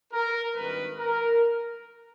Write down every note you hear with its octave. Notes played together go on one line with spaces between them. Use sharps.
A#4
G#1 G2 D#3 B4
A#4